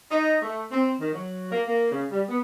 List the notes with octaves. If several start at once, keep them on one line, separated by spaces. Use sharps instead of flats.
D#4
A3
C4
D#3
F#3
A#3
A#3
C#3
G3
B3